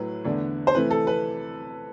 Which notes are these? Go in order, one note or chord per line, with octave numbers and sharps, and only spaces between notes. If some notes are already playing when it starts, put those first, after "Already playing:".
Already playing: A2 F#3 A3 B4
E2 D3 A3 D4
C5
C3 E3 A3 B4
A4
B4